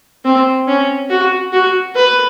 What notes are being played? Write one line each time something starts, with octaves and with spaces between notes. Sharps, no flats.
C4
C#4
F#4
F#4
B4